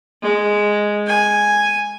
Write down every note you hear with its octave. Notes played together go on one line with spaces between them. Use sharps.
G#3
G#5